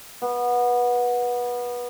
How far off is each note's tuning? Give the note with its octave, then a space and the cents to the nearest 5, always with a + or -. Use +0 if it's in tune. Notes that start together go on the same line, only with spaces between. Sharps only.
B3 -20